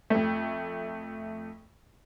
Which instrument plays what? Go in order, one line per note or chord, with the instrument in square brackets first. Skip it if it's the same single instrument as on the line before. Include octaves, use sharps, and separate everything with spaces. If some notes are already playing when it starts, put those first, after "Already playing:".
[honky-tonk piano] F2 A3